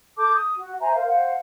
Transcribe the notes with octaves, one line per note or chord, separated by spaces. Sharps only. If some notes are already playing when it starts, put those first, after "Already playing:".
A4 A5 D6 G6
D#6
F#4
C5 E5 G#5 A#5
A#4 C5 F5
C5 F5 F#5